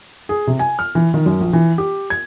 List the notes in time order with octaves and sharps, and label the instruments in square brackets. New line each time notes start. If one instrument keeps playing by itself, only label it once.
[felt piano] G#4
C3
G#5
F6
E3
D#3
F#2
A#1
E3
G4
G#6